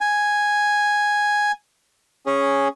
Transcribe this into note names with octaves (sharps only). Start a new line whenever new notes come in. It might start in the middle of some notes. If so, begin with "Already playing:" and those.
G#5
C#4 G#4